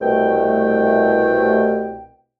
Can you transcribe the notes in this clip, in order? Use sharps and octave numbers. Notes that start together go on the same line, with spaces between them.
C2 B2 A3 G5